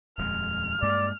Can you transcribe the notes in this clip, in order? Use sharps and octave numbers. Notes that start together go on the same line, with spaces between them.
D#1 F2 G#3 F6
G2 G#3 A#3 D5